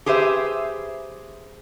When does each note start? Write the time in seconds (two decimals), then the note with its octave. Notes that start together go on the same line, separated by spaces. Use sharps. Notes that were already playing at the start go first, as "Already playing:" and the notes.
0.06 G4 G#4 B4 C5 E5